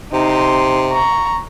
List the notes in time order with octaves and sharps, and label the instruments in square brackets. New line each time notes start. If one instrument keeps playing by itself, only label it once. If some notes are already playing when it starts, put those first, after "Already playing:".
[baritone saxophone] C3 [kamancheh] D#4 C6
[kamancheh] A#5 C#6